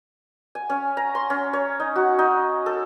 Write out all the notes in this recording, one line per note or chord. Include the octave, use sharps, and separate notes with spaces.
G#5
C#4
A#5
C6
C#4
C#5
D#4
F#4
D#4
A4